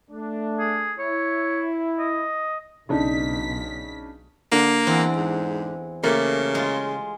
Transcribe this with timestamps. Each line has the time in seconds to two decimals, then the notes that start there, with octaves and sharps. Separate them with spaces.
0.11 A3 D4
0.59 G#4
0.99 E4 C#5
1.99 D#5
2.89 B1 C#3 D4 D#4 B6
4.52 D3 A#3
4.87 E2 C4
5.17 G#2
6.04 C#3 A3 A#3 G4
6.55 G#3 F4